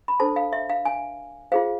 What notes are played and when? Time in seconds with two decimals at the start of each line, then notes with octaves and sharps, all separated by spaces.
0.08 B5
0.20 D4 A4 C5 A5
0.36 F5
0.53 E5
0.70 F5
0.85 G#5
1.52 F4 G#4 C5 F5